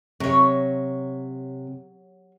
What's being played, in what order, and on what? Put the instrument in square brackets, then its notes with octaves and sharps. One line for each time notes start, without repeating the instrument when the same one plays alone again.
[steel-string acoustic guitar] C3 [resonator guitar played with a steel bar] F#3 C#5